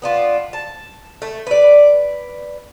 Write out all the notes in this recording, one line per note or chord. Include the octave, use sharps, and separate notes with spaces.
B3 D4 F4
A5
A3
B4 D5